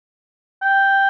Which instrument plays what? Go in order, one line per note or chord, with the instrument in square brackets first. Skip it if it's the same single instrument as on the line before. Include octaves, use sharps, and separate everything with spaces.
[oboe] G5